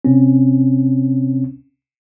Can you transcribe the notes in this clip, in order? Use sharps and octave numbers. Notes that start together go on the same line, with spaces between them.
C3 C4 C#4